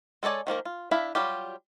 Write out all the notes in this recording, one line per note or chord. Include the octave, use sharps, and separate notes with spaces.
G#3 A4 C#5 D5 G#5
D#3 F3 A#3 A#4
F4
D4 E4 E5 F5
F#3 G3 F4 G4